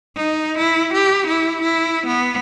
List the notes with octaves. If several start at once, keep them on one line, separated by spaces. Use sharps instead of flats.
D#4
E4
G4
E4
E4
B3